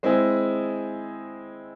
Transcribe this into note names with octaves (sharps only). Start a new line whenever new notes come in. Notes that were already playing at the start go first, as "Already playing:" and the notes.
G#3 C4 E4 G#4